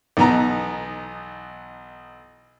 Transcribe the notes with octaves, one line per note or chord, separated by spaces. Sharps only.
B1 E3 B3 D#4 A5 A#5